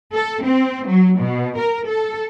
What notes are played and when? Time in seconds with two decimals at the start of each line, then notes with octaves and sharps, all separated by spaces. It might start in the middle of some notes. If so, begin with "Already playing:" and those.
0.14 A4
0.44 C4
0.86 F#3
1.19 B2
1.57 A#4
1.88 A4